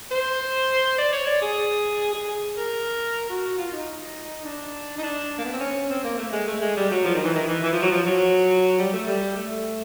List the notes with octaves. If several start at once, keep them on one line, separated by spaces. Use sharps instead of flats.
C5
D5
C#5
D5
G#4
G#4
G#4
A#4
F#4
F4
D#4
D4
D#4
D4
A#3
B3
C4
C#4
C4
A#3
A3
G#3
A3
G#3
G3
F#3
F3
D#3
E3
D#3
E3
E3
F3
F#3
F3
F#3
G3
A3
G3
A3